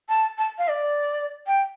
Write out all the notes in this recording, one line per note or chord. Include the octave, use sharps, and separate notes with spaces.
A5
A5
F5
D5
G5